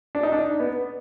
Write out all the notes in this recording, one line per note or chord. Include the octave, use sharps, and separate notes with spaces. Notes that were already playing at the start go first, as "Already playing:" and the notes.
D4
D#4
D4
B3